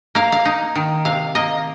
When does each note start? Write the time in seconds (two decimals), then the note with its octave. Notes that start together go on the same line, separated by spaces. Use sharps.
0.15 A#3 F5
0.32 F5
0.45 D#4
0.75 D#3
1.05 C3 F5
1.35 A#3 D#5